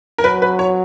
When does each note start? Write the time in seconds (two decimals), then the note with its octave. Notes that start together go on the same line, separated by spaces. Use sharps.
0.18 A#4
0.24 F#3 B4
0.42 B4
0.59 C#5